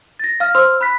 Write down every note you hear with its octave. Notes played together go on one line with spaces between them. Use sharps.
A6 A#6
F5 F6
C5 C6 E6 F6
B5 F#6 B6